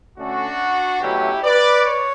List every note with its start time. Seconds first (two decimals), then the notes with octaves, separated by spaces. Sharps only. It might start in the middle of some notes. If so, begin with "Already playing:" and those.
0.18 D3 A3 C#4 D4 F#4
1.01 B2 F#3 A3 C#4 E4 G4
1.42 B4 D5
1.84 C#5